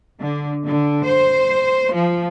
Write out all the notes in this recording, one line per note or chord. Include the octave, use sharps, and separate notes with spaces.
D3
D3
C5
F3